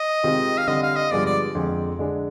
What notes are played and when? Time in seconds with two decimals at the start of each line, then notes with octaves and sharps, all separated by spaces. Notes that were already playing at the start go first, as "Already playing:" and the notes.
Already playing: D#5
0.23 C3 D#3 G#3 C4 F4
0.58 F5
0.67 D3 G3 C4 D#5
0.82 F5
0.96 D#5
1.11 G2 D3 F3 G#3 B3 D5
1.26 D5
1.55 F2 D3 G#3
1.99 D3 G#3 D4